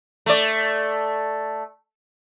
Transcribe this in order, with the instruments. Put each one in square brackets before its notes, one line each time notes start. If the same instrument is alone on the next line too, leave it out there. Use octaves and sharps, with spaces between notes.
[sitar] A3 D5